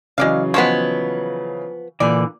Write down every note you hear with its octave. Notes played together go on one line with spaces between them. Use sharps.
C#3 E3 F#3 G#3 D5 F5
F3 G#3 B3 C5 C#5
A#2 D3 E3 D5